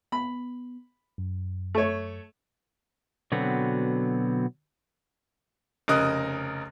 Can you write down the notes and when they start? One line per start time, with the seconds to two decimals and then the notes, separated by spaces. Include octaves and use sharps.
0.12 B3 B5
1.18 F#2
1.75 A3 C#5
3.32 B2 D3 F#3 B3 C4
5.88 F1 C#3 A#4 D#5 D#6 F#6